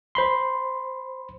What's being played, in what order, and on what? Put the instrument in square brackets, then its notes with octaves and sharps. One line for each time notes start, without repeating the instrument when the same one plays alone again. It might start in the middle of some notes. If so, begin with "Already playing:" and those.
[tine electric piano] C5 B5 C6